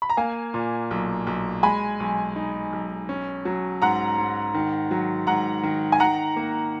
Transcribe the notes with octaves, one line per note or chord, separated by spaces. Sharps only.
B5
A#5
A#3 F5 G#5
A#2
B1
B1
G#3 G#5 B5
B1
D#4
B1
C#4
F#3
G#2 F#5 A#5
G#2
D#3
F#3
G#2 F#5 A#5
D#3
G#5
D#3 F#5 A#5
A#3